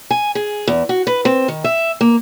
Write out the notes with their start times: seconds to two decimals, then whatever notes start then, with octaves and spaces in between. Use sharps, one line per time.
0.11 G#5
0.35 G#4
0.68 E2
0.89 F#4
1.07 B4
1.25 C4
1.48 D#3
1.64 E5
2.01 A#3